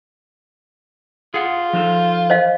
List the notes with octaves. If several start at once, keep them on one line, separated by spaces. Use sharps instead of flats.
F4 G#4 F#5
F3 D#4 A4
C5 D#5 F5